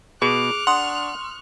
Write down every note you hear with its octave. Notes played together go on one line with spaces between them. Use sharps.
B2 G#4 C#6 D6 F6 F#6
D4 F#5 C6 D#6